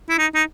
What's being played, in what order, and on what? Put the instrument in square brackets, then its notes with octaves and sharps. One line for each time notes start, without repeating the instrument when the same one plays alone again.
[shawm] E4
D#4
D#4